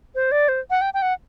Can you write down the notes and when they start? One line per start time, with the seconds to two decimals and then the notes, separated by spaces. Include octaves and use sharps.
0.15 C5
0.31 D5
0.48 C5
0.70 F#5
0.81 G5
0.94 G5
1.02 F#5